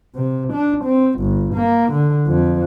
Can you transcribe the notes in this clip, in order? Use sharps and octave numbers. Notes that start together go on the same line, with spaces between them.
C3
D4
C4
G1
A#3
D3
F2